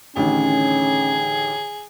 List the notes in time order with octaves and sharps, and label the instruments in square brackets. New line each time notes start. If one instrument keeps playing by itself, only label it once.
[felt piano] A1 D3 D#3 [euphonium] C#4 [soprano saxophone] G#4